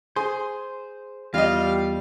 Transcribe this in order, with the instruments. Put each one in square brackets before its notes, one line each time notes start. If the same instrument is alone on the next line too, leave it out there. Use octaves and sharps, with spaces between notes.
[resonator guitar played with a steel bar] G#4 [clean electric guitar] C5
[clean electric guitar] E2 [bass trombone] G3 [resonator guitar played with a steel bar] F4 D#5 [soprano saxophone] F5